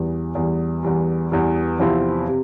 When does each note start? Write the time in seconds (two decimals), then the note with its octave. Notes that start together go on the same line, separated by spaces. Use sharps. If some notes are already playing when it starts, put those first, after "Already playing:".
Already playing: E2 E3 G3
0.35 E2 E3 G3
0.83 E2 E3 G3
1.31 E2 E3 G3
1.79 E2 C3 F3 C4 E4
2.28 C3